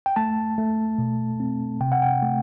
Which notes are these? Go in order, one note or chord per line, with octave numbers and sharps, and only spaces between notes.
G5
A3 A5
A3
B2
C4
C3 G5
F#5
G5
A3